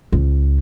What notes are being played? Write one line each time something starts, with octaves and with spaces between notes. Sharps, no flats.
C#2